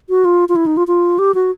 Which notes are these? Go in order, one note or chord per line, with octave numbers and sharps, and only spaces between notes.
F#4
F4
F4
E4
D#4
F4
F4
G4
F#4